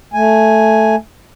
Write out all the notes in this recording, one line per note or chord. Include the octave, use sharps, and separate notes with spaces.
A3 G#5